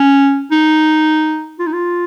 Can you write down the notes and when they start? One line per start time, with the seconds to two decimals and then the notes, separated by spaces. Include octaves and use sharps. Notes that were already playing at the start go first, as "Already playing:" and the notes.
Already playing: C#4
0.51 D#4
1.59 F4
1.67 D#4
1.73 F4